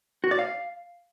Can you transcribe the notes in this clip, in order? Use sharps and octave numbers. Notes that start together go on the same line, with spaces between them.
F#4
D5
F5